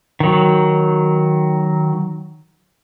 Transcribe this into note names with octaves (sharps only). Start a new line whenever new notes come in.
D#3 F#3